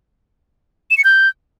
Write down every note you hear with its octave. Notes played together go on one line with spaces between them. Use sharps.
E7
C#7
G6